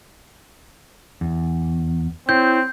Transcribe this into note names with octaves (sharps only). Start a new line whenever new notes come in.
E2
C4 E4 C#5 G6